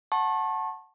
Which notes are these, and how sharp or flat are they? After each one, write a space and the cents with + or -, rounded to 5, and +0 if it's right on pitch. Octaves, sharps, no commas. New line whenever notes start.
F#5 +0 A5 +0 C#6 -40